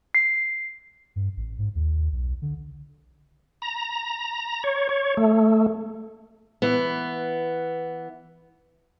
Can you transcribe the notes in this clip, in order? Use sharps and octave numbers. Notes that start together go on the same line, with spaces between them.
C7
G2
A1
G#2
D#2
B1
D3
A#5
C#5
C#5
A3
E3 B3